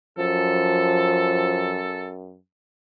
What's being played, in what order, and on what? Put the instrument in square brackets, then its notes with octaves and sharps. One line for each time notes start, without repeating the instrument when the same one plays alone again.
[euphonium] F#2 [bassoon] F3 [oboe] A4